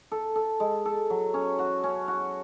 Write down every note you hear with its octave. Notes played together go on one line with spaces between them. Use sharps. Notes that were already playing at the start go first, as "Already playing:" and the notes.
A4
A4
G#3
A4
F#3
C#4
F#4
C#4
F#4